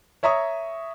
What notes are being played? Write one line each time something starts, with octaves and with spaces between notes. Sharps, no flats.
C#5 E5 A#5 C#6 D#6